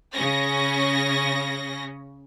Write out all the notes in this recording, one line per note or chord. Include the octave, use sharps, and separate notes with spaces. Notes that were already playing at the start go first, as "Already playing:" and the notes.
C#3 C#4 A#6